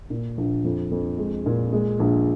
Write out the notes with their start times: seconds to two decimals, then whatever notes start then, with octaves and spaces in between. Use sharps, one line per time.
0.10 A#2
0.38 A#1
0.65 F2
0.91 F2
1.18 G#3
1.46 A#2
1.73 G#3
1.99 A#1